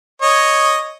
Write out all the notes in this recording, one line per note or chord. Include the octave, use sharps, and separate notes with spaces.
C#5 D#5